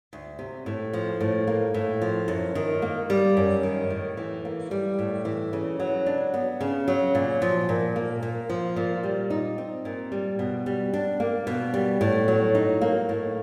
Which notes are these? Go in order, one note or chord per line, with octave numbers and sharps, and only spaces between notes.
D2
C3
A2
F3
A2
A#3
A2
F3
F#2
D#3
A#3
G3
F#2
D#3
A2
E3
A#3
G3
A2
E3
C#3
F#3
D4
B3
C#3
F#3
A#2
F3
A#2
A#3
A#2
F3
A#2
G3
D#4
C4
A#2
G3
B2
G3
D4
A#3
B2
G3
A2
F#3
D#4
A#3
A2